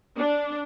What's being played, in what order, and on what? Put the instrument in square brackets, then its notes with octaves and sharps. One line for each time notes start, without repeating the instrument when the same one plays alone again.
[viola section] D4